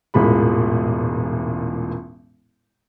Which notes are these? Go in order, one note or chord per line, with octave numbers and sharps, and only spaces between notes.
E1 A1 A#2 G#3 B5